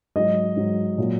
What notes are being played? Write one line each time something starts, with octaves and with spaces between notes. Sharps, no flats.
G#2 F#3 D#5
G#2 F#3
A#2 F#3